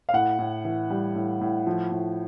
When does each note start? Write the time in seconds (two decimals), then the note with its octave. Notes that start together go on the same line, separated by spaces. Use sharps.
0.09 F5
0.13 A2 F#5
0.39 A2
0.65 E3
0.90 G3
1.15 A2
1.41 A2
1.67 F3
1.92 A2